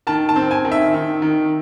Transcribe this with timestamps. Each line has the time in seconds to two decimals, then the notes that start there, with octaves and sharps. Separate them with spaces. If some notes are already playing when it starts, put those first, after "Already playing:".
0.07 D#3 A5
0.29 A5
0.36 C4
0.51 G#5
0.65 D#3
0.72 E5
0.94 D#3
1.22 D#3